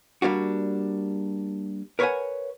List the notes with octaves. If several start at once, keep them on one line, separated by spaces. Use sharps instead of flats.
G3 A#3 D4 F#4
A#4 B4 C#5 D5 F#5 G#5